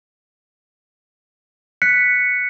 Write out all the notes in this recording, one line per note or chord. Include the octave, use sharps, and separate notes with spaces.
F#6 B6 C#7